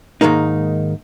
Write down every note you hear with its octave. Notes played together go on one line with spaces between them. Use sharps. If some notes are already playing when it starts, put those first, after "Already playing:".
G#2 D#3 G#3 A#3 D#4